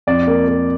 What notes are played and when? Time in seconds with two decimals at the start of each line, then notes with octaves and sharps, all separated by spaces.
0.07 F2 D5
0.27 A#3
0.48 A#3